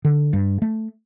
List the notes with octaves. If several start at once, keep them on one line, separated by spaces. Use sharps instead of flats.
D3
G2
A3